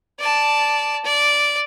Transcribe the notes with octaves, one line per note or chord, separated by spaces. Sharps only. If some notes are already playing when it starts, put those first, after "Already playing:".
D5 A5
D5